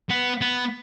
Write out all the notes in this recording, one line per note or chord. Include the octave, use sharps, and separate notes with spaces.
B3
B3